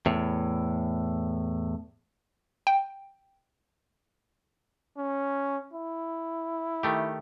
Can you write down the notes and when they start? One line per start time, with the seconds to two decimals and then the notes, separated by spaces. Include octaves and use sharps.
0.06 E2 A2
2.67 G5
4.97 C#4
5.73 E4
6.83 D#3 A3 G4